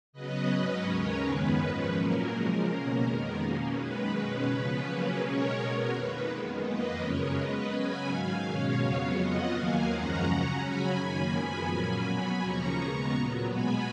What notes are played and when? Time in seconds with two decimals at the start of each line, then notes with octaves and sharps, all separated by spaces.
0.13 C#3 F#3 B3 B4 D#5
0.49 G#2 F#3 C#4
0.85 D#2 C#3 G#3 C#4 A#4 C#5
1.21 F#2 D#3 G#3 B3 B4
1.57 G#2 F3 G#3 C#4
1.93 A#2 F#3 A#3 C#4 A#4
2.30 C#3 F3 G#3
2.65 B2 A#3 C#4 A#4
3.02 F2 D#3 G#3 B3
3.38 B2 A#3 C#4
3.74 F#2 D#3 G#3 B4
4.10 B2 G#3 C#4 B4
4.46 C#3 F3 B3 B4
4.82 C#3 F#3 A#3 C#4
5.18 B2 G#3 C#4 A#4 C#5
5.54 B2 G#3 B3
5.90 F2 D#3 A#3 B4
6.26 F#2 D#3 G#3 B3
6.62 F2 F3 A#3 B4 D#5
6.99 F#2 C#3 G#3 C#4 A#4 C#5
7.34 C#3 G#3 B3 B4 D#5
7.70 C#3 F#3 C#4 G#5 B5
8.07 G#2 D#3 F#3 F5 G#5
8.43 B2 G#3 C#4 C#5 F5
8.79 F2 C#3 F#3 B3
9.15 F2 F3 B3 D#5 F#5
9.51 D#2 D#3 F#3 A#3 F5 G#5
9.87 F#2 F3 G#3 C#4 F#5 A#5
10.23 C#3 F#3 C#4
10.59 C#3 F#3 C#4 G#5 B5
10.95 F#2 D#3 A#3 C#4 G#5 B5
11.31 F#2 F3 G#3 B3
11.67 A#2 F#3 A#3 C#4 G#5 B5
12.04 B2 F#3 B3
12.40 D#2 C#3 F3 A#3 C#4 A#5 C#6
12.76 C#3 G#3 B3
13.12 A#2 F#3 B3
13.48 B2 G#3 B3 G#5 B5